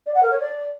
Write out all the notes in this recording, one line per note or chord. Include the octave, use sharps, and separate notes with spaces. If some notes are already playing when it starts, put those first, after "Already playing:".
D5
F#5
A#4
C#5
D5